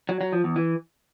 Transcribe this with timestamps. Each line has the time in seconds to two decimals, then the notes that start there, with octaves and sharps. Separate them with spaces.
0.09 F#3
0.21 F#3
0.32 F3
0.44 E2
0.56 E3